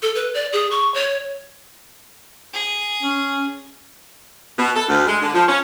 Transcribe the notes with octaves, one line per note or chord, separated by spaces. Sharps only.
A4
B4
D5
G#4
C#6
C#5
G#4
C#4
B2
A4
D2
G#3
D3
F3
C#4